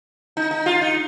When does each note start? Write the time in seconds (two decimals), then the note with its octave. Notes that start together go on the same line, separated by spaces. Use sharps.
0.37 D#4
0.51 D#4
0.66 F4
0.81 D#4